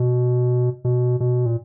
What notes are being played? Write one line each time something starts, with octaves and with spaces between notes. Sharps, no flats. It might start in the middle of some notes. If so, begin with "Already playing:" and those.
Already playing: B2
B2
B2
A#2